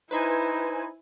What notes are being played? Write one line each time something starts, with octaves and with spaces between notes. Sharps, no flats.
D#4 E4 B4 C5 G#5